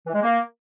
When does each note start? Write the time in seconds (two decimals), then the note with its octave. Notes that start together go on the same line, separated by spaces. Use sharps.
0.06 E3
0.14 G#3
0.23 A#3